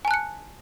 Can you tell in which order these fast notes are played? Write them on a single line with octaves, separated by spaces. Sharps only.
G#5 A5 F#6 C#7